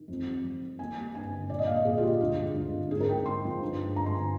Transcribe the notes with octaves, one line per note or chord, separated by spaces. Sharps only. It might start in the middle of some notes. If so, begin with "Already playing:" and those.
Already playing: D#3
F2
G3
F2
D#3
A#3 G#5
G3
G2 G#5
D3
A#2 D5
D#5
A#3 F5
D#5
A#2 G#4
F4
G3 G4
D2 F4
G#3
D2
D3
G#2 G#4
A#4
G#3 G5
G#2 C6
F3
G2
G#3
G2 A#5
C6
D3 G#5